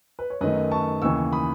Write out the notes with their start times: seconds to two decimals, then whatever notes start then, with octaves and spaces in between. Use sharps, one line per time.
0.19 B4
0.30 C#5
0.41 F#2 D#3 A3 B4 D#5
0.71 A5 C#6
1.02 D#2 C#3 E3 C#6 E6
1.33 B5 D#6